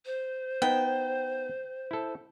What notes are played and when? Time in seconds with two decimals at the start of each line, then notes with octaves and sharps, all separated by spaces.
0.06 C5
0.62 B3 D#4 G5
1.91 E4 A4